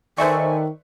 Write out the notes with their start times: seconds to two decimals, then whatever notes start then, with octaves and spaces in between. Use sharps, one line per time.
0.18 D#3 A4 B4 C5 D5 E5 G#5 C#6